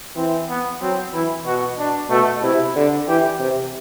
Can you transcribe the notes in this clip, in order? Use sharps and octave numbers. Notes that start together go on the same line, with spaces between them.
E3 C4
B3
F#3 C4
E3 E4
B2 F#4
D4
B2 A3
C3 E4
D3
E3 G4
C3